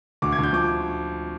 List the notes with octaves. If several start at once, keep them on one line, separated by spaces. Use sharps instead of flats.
D2 D6
G#6
D2
G6
F3 D6